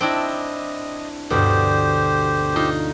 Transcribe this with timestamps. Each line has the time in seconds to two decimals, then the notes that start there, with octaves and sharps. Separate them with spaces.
0.01 C4 D4 E4 D#5 G5 A5 A#6
1.30 D2 G2 B2 G4 C5
2.56 D#4 F4